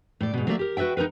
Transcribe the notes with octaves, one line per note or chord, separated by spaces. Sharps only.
A2 D5
G#2 B2
F#3 A3 A#3 C#4 D5 E5
G4 A#4
F#4 B4 D5 E5 G5
D#4 F4 A#4 B4